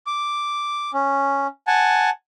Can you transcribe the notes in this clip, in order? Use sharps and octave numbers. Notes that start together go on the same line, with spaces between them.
D6
C#4
F#5 G#5 A5